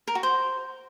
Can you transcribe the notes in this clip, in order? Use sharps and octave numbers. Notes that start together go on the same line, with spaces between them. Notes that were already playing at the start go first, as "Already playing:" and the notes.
A#4
F#4
C5